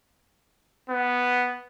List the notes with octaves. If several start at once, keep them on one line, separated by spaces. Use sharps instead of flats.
B3